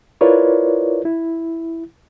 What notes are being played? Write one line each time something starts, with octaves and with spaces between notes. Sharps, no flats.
E4 F4 A#4 B4 C#5 D5
E4